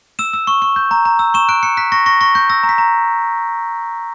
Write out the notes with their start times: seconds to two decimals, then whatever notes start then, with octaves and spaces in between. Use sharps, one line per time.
0.19 E6 E7
0.33 E6
0.47 C#6
0.62 C#6
0.76 G6
0.91 A#5
1.05 A#5
1.19 E6
1.34 C#6 E7
1.49 F#6 D7
1.63 F#6 C#7
1.77 F#6 B6
1.92 C#6 A#6
2.06 C#6 A#6
2.21 C#6 A#6
2.35 C#6 G6
2.50 E6 A#6
2.63 A#5
2.69 B6
2.78 A#5